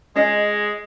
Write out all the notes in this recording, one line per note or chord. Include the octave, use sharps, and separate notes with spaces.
G#3 C#4 F4 D#5